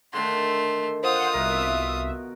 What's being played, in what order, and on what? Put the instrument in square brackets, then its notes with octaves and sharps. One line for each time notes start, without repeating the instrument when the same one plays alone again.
[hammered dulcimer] D3 D#3 [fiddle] A3 C6
[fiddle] F4 D#6 [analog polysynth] C5 F#5
[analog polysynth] C2 E5 [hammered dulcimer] B2 A#4